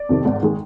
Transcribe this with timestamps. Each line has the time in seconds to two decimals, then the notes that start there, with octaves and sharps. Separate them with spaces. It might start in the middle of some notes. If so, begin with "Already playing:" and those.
Already playing: D5
0.09 F2 C3 D#3
0.25 G#1
0.43 D#3 G#3